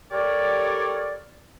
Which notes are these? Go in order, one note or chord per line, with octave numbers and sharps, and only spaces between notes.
G3 G4 A4 A#4 C#5 D5